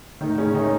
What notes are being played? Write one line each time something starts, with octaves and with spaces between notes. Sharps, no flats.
A2 D#3 D#4
A2 C#3 C#4
D#3 G#3 D#4